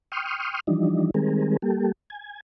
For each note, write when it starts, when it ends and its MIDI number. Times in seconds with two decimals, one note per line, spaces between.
0.12 0.60 79
0.12 0.60 84
0.12 0.60 85
0.12 0.60 87
0.12 0.60 89
0.67 1.10 52
0.67 1.10 53
0.67 1.10 55
0.67 1.10 62
0.67 1.10 63
1.14 1.57 51
1.14 1.57 55
1.14 1.57 56
1.14 1.57 60
1.14 1.57 68
1.14 1.57 70
1.62 1.92 55
1.62 1.92 58
1.62 1.92 67
1.62 1.92 69
2.10 2.40 80